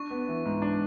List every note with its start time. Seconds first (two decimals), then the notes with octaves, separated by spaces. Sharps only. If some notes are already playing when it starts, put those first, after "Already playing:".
Already playing: D4 C#6
0.10 B3
0.28 E3
0.45 G#2
0.62 D4